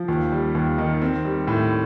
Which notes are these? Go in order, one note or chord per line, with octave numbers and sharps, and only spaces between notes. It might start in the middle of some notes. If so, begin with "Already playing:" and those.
Already playing: F3
D#2
G3
D#2
D#3
C4
G3
A2